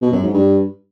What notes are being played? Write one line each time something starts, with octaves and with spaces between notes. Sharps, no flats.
B2
F#2
G#2
G2